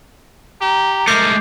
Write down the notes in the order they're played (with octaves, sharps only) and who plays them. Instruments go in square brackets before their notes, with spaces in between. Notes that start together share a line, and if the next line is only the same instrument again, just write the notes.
[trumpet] G4 [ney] A#5
[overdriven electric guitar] G#3 A3 [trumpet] A#4 [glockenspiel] D6 G6 C7